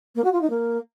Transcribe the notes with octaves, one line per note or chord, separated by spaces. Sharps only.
A#3
F#4
F4
D#4
A#3